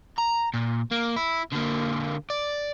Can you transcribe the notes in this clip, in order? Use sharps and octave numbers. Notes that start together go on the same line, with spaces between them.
A#5
A#2
A#3
E4
D3 A#3
D5